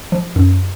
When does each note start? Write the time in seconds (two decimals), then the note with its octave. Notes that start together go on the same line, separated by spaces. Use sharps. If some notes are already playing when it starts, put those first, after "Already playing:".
0.12 F3
0.36 F#2